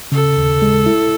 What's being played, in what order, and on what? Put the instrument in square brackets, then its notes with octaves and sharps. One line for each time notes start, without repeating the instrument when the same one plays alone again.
[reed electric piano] C#3 [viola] A4
[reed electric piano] D#2
G#3
E4